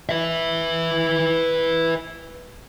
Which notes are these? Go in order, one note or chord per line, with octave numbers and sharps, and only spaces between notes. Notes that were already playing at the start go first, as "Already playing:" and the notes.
B4 E5